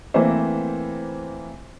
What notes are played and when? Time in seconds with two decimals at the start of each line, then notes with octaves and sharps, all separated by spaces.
0.14 E3 A3 A#3 C4 B4 C5